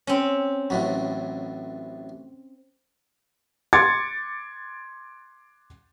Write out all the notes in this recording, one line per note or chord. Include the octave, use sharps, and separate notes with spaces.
C4 C#4
A1 A2 F#3
C6 D6 G#6 A6 C#7